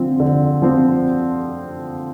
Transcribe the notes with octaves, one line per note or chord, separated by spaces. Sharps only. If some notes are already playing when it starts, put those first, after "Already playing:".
Already playing: D3 F3 C4
D3
F3 C4